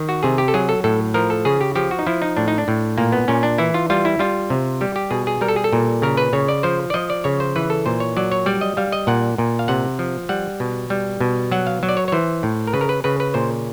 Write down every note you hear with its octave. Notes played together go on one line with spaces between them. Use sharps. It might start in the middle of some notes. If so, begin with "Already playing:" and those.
Already playing: D#3
F#4
C3 G#4
G4
A4
F#3 G#4
A4
A2 A4
F3 A#4
A4
C#3 G#4
G4
F3 G4
F#4
D#4
F3 E4
D#4
A2 D4
D#4
D4
A2
A#2 A#3
B3
A#2 C#4
D4
E3 E4
F4
G3 F4
E4
G3 F4
C3
G3 G4
G4
B2 G#4
G#4
G3 A#4
A4
G#4
A4
A#2
C#3 A#4
B4
C#3 C#5
D5
F3 C5
D5
F3 D#5
D5
C#3 C#5
C5
E3 B4
A4
A#2 C5
C#5
F#3 D5
C#5
G3 D5
D#5
G3 F5
D#5
A#2 F#5
A#2
F5
C3 F#5
F3
G3 F#5
B2
G3
B2
F#3 F#5
F5
F#3
D5
C#5
C#5
E3 C5
A2
A#4
C#3 B4
A#4
B4
C#3 B4
B4
A#2 C5